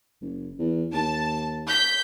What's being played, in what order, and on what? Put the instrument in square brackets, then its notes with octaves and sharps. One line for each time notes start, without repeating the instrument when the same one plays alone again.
[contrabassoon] F#1
E2
[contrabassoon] D#2 [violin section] A5
[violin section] G6 B6